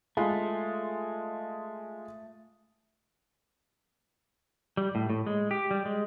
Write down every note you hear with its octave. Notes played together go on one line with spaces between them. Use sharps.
G#3 A3 F4
G3
A2
A2
G#3
G4
G3
G#3